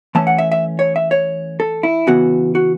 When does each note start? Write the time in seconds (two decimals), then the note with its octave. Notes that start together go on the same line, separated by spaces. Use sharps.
0.15 E3 A3 C#4 A5
0.27 F#5
0.38 E5
0.52 E5
0.79 C#5
0.96 E5
1.11 C#5
1.60 A4
1.83 E4
2.07 C#3 E3 B3 F#4
2.55 F#4